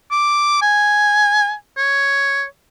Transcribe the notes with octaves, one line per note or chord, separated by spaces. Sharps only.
D6
G#5
C#5